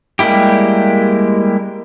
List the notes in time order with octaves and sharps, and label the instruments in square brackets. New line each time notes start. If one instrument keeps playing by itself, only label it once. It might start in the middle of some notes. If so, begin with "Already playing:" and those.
[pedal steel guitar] G3 G#3 A#3 E4 G4